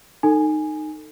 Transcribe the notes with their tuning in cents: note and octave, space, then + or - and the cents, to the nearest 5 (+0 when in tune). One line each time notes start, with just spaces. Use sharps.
D#4 -15 A4 +20 G#5 +0